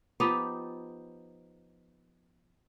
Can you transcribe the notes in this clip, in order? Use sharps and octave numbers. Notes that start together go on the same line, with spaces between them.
F3 B3 D#4 G4